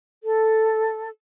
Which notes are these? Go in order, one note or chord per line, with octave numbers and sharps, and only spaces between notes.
A4